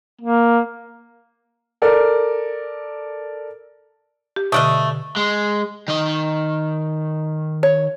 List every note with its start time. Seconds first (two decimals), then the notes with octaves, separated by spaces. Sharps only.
0.21 A#3
1.82 A4 A#4 D5
4.36 G4
4.52 B2 D3 A3 D5 D#5
5.16 G#3
5.88 D#3 D#5
7.63 C#5